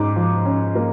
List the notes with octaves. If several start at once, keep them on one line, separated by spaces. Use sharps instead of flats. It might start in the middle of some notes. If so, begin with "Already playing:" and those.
Already playing: G#2 C#4 D6
F3
C#4
A#3